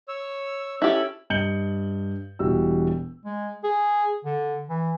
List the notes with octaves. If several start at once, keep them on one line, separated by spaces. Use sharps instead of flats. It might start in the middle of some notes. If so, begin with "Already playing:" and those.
C#5 E6
C#4 E4 G4 A4 B5
G2 D#5 G6 C#7 F#7 G7
E1 E3 G3 F#4 E6
G#3
G#4
D3
E3